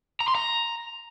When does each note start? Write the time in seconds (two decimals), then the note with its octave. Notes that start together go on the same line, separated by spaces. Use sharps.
0.20 A#5
0.28 C6
0.35 A#5